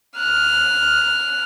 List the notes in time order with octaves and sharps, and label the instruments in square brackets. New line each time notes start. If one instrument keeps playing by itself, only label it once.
[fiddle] F6 F#6